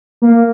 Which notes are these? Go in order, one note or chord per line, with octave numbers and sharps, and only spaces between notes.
A#3